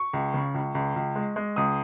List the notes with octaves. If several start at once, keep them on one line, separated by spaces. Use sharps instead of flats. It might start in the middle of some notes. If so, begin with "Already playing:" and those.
Already playing: C#6
C#2
C#3
C#2
C#2
C#2
G#3
G#3
C#2 D#6